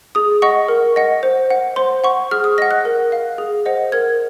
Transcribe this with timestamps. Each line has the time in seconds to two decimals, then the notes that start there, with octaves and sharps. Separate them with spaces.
0.15 G#4 D#6
0.42 D#5 F#5 C#6
0.68 A#4
0.96 D#5 F#5
1.23 C5
1.50 F#5
1.76 C5 C6
2.04 F#5 C#6
2.31 G#4 F6
2.44 D#6
2.58 D#5 F#5 A#6
2.71 F#6
2.85 A#4
3.12 F5
3.38 G#4
3.66 C5 D#5 F#5
3.92 A#4 G#6